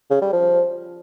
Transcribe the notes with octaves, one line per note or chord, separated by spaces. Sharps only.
C#3
G3
F3